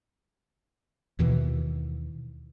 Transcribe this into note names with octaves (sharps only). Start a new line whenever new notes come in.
D#2 B2 D#3 E3